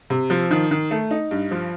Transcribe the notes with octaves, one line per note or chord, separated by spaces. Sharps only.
C3
F3
D#3
D#3
A3
D#4
G2
F3